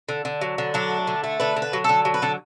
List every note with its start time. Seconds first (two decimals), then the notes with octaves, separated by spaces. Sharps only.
0.09 D3
0.25 D3
0.41 F#3
0.58 D3
0.74 F#3 D4
0.90 A3
1.07 D3
1.24 A3
1.40 D3 B4
1.56 D3
1.62 B4
1.73 F#3
1.84 D3 A4
2.05 F#3
2.14 B4
2.22 D3 A4